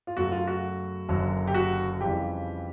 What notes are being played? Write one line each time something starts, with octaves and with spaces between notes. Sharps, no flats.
F4
F#2 C#3 F#3 A3 F#4
F4
F#4
F#1 F#2 D3 F#3
G4
F#4
F2 C#3 E3 G3 G4